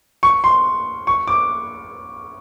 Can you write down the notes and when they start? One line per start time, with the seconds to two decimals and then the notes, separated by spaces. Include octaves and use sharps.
0.23 C#6
0.44 C6
1.07 C#6
1.27 D6